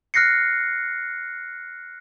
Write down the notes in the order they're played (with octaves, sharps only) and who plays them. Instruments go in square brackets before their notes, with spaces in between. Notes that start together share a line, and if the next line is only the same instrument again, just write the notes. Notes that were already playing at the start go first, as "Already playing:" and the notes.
[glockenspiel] F6 F#6 A#6 C7 C#7